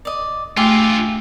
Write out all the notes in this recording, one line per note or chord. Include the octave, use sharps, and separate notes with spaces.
D5 D#5
G2 A3 F4 G4 G#4 E5